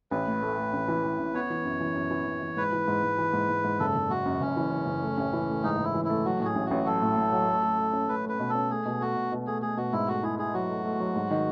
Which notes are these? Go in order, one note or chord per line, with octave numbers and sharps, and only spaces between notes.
A1 B4
A2
A3
A3
A1
E3
E3
A1
B3 C#5
E3
F#2
E3
F#2
E3
F#2
E3
G#2 B4
E3
G#2
G#2
E3
G#2
G#2
G#2
F#1 A4
F#1
F#1 F#4
F#2
F#1 C#4
E3
E3
F#1
A3
A1
E3
A3
G#2 D#4
G#2
E4
E3
A3 E4
F#3 F#4
A2 G#4
A1
A1 F#4
F#3 A4
A2
A2
F#3
A3
A3
A3
C#4
A3 B4
A3
B4
B2
C#4 A4
A3 G#4
B2
A3 F#4
B2
B2
A3 G#4
A3 G#4
B2 F#4
G#2 E4
A3 F#4
E4 G#4
E4 G#4
F#3 F#4
A3
A3
F#3
G#2
D#3